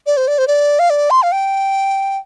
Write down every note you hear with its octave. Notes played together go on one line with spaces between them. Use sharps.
D5
C5
D5
C5
D5
F5
D5
C6
F5
G5